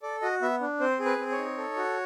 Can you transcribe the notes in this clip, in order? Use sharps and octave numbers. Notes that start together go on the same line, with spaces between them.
A4 D5
F#4 D#5
B3 E5
D4
C4 C5
G#4
B4
C4
C#5
D#4
A4
F#4